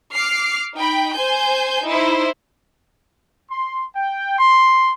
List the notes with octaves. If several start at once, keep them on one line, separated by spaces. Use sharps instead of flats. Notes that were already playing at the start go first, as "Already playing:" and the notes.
D6 F6 C7
D#4 G5 B5
C5 G#5 G6
D#4 E4 C5
C6
G5
C6